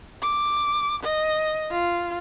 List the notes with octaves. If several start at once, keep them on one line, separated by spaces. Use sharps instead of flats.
D6
D#5
F4